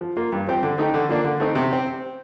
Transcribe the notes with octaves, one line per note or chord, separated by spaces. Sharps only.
F3
A#3 F4
G2
F3 C4 G4
D3
A3 D#4 G4
D3
F3 A#3 D4
D3
A3 C4 D#4
C3
C4 G4